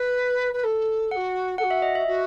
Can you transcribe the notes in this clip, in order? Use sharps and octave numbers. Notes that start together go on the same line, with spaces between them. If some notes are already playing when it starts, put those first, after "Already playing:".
Already playing: B4
B4
A4
F#4 A4 F#5
F#4 A4 F#5
E5
D#5
E5
F#4